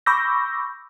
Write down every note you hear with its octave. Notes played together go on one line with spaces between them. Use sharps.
B5 C#6 D6 E6 G6 A#6